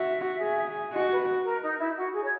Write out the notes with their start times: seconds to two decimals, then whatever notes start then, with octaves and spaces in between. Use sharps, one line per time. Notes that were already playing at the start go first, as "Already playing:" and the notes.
Already playing: F#4 E5
0.41 G#4
0.93 F#4 D#5
1.10 B4
1.44 A#4
1.62 D#4
1.78 E4
1.96 F#4
2.13 G#4
2.24 C#5